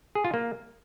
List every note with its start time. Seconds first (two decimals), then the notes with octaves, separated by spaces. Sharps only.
0.15 G#4
0.25 F4
0.34 A#3